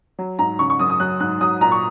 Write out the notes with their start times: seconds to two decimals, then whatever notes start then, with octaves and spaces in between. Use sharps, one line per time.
0.19 F#3
0.39 G#2 A#5
0.59 C#3 C#6
0.70 C#6
0.79 F#2 D#6
0.90 D#6
1.00 F#3 F#6
1.20 G#2 F#6
1.41 F#3 D#6
1.61 A#2 A#5
1.72 C#6